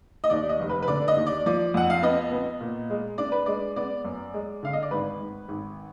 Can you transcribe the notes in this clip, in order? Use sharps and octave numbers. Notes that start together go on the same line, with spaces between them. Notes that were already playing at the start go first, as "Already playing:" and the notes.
D#5
D#2 D5
D#5
F1
B4
B4
D3 D5
D#5
D#2
D5
F3 D5
F2 F#5
F5
B3 D#5
B3
A#2
G#3
D4 D5
B4
G#3 D5
B3 D5
F#2
G#3
D3 F5
D#5
D5
G#1 B4
G#1
G#1